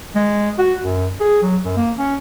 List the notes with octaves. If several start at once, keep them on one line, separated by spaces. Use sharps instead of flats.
G#3
F#4
F#2
G#4
F#3
F#2
A#3
C#4